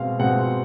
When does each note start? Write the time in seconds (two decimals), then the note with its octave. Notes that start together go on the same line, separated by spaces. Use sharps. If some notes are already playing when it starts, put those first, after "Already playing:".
Already playing: B2 G#3 C4 F5
0.19 B2 G#3 C4 F#5